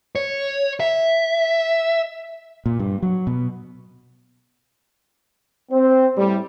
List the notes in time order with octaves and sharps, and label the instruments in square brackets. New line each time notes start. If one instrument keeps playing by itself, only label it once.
[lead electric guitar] C#5
E5
[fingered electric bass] A#2
G2
F#3
B2
[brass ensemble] C4 C5
A2 G3